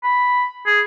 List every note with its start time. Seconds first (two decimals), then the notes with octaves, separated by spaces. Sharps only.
0.04 B5
0.67 G#4